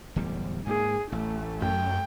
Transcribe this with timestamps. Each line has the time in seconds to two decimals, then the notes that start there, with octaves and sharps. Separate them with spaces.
0.16 D1 E2 G3
0.67 G#2 A#3 G#4
1.12 A1 A3
1.62 F#2 G5